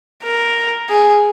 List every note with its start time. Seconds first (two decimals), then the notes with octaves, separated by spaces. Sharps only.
0.23 A#4
0.89 G#4